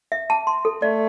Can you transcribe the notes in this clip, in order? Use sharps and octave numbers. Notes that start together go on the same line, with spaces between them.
E5
A5
C6
A4
A3 D5